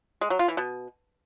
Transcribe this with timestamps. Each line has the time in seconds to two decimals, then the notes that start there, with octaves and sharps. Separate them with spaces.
0.21 G#3
0.30 F#3
0.39 F4
0.48 E3
0.57 B2